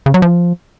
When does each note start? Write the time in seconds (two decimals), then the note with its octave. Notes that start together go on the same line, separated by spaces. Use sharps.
0.06 C#3
0.14 F#3
0.22 F3